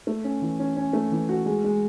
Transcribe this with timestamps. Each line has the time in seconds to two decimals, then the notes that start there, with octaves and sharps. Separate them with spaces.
0.07 A3
0.24 C#4
0.42 E3
0.59 C#4
0.77 C#4
0.93 A3
1.12 E3
1.29 F#4
1.46 G#3
1.64 G#3